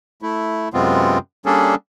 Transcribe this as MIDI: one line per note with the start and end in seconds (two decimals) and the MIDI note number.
0.22 0.69 57
0.22 0.69 64
0.74 1.18 42
0.74 1.18 48
0.74 1.18 56
0.74 1.18 59
0.74 1.18 60
0.74 1.18 65
1.46 1.75 55
1.46 1.75 58
1.46 1.75 61
1.46 1.75 62
1.46 1.75 68
1.46 1.75 69